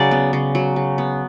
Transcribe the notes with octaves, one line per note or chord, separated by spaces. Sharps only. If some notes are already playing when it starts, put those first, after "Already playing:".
Already playing: C#3 F#3 D5
B3
C#3
F#3
C#3
B3